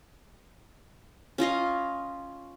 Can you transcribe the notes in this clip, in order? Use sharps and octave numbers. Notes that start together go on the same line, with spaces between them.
C#4 F4 D#5 F5